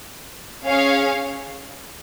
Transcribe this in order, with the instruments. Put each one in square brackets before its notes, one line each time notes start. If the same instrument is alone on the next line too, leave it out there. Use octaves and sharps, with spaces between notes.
[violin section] C#4 G#4 C#5 F5